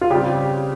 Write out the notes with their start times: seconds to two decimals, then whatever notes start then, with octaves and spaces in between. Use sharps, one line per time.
0.01 F4
0.10 C#3 G3 C4 G4